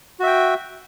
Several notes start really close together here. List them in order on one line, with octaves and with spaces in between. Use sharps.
F#4 E5 G5